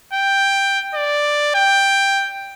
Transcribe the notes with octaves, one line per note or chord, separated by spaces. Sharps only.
G5
D5
G5